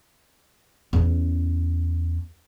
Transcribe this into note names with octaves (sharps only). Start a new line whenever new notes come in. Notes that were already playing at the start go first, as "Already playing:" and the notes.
E2 C#4